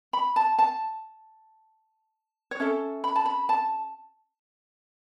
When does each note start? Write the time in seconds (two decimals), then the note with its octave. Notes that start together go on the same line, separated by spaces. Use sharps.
0.13 B5
0.36 A5
0.58 A5
2.51 C#5
2.60 C#4 A4 E5
3.04 B5
3.16 A5
3.25 B5
3.49 A5